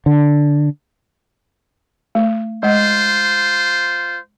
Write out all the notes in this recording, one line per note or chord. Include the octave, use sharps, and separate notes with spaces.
D3
A3
G#3 F4 C5 F#5